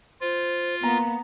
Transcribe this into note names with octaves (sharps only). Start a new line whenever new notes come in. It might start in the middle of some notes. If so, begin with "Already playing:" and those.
F4 C5
A#3 B3 A#5